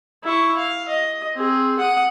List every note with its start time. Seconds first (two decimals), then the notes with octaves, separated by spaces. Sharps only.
0.24 E4 C#6
0.57 F5
0.88 D#5
1.36 C4 G#4
1.79 F#5 D#6